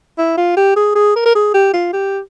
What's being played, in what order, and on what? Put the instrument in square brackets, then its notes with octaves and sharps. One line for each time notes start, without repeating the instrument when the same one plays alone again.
[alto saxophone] E4
F4
G4
G#4
G#4
A#4
A#4
G#4
G4
F4
G4